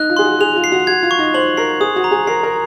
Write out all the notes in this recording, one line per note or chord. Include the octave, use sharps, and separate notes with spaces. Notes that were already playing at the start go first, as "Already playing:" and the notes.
Already playing: D#4 F#6
F4
G#4 C6
F#4
G#4 F7
F4
C7
F#4
F#4 G#6
F4
C#6
D#4
C5 F#7
A#4 C7
G#4 D#6
F#4
A#5
G#4
A#4 C7
A#4